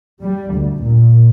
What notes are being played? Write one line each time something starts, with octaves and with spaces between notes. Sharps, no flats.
G3
D2
A#2